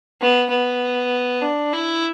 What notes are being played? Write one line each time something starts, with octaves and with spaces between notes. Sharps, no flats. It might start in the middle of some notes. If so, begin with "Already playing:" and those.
B3
B3
D4
E4